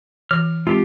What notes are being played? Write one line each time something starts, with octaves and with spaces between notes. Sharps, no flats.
E3 F6
G#3 C4 F4 G4